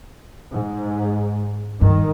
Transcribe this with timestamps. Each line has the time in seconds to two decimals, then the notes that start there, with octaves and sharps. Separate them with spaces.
0.52 G#2
1.81 G2 D#3